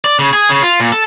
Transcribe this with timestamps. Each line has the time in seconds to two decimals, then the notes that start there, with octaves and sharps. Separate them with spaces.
0.05 D5
0.19 C#3
0.33 G#4
0.50 C#3
0.62 F4
0.80 A#2
0.93 A4